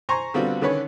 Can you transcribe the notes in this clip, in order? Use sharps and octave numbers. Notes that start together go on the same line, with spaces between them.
C5 G#5 A#5 C#6
D3 G3 B3 C4 F4 F#4
D3 D#3 C#4 B4 C#5